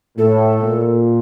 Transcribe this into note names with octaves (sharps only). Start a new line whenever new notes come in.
A2 A4
A#2